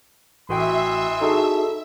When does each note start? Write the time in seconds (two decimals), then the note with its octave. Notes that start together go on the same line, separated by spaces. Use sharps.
0.49 A1 E3 F#4 D#5 E5 G5 C6
1.21 D#4 F#4 G#4 A4